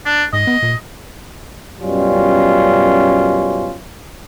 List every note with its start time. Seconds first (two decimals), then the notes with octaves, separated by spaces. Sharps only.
0.06 D4
0.33 G#2 D#5
0.47 B3
0.63 A#2
1.81 F#2 B2 G3 C#4 F4